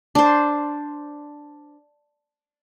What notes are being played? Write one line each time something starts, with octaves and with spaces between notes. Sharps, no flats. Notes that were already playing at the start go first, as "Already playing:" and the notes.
D4 C5